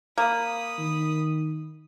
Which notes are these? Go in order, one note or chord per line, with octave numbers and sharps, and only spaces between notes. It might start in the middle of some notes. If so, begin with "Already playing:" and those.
A#3 B5 D#6
D#3